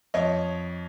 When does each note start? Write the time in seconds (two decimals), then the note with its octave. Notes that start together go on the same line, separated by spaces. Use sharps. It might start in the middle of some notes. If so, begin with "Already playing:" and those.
0.14 F2 C#5 D#5